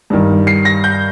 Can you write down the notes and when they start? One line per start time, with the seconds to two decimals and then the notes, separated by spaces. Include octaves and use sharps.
0.10 G2 D#3
0.47 C7
0.65 A#6
0.84 G6